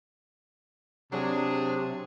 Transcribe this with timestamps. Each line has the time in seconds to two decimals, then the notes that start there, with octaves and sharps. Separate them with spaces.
1.12 C3 F#3 D4 G#4